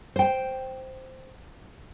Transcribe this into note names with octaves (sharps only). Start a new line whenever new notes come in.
C5 G5